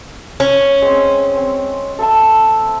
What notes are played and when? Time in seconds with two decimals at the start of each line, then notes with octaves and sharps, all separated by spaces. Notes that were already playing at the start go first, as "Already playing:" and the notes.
0.40 C#4
0.82 G#3 C4
1.37 C4
1.99 A4 E5 A5